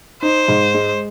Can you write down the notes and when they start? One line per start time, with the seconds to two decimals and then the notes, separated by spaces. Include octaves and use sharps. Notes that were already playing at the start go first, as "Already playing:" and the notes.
0.22 D#4 C5
0.48 G#2
0.74 G#3